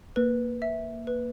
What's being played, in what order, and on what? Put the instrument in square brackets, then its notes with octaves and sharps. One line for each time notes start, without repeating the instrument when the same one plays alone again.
[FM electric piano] A#3 [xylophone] B4
[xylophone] E5
B4